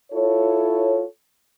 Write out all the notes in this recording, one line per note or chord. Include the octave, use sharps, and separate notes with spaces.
E4 F4 A4 C#5